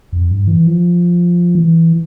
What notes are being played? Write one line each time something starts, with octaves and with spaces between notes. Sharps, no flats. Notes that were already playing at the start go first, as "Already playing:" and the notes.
F2
G2
E3
F3
E3